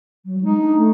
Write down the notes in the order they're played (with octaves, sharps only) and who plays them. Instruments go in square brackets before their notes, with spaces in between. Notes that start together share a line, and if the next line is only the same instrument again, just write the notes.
[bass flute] F#3
[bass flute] G#3 [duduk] D#4
[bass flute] D4
A3